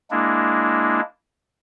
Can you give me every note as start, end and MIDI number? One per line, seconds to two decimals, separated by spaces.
0.11 1.01 56
0.11 1.01 58
0.11 1.01 62
0.11 1.01 64